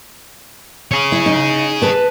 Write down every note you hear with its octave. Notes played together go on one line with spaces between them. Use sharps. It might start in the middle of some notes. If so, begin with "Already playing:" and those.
G#4 C#5
E4
D#4
B4 A5